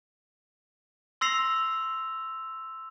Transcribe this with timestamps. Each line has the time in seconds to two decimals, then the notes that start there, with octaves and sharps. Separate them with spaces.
1.21 C6 E6 A#6 C7 F7